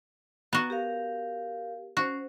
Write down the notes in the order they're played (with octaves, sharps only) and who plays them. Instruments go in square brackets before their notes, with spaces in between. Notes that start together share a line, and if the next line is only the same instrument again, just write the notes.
[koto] B3 F#4 [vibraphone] A#5
[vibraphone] G4 A#4 F5
[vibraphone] C#4 C5 [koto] F#4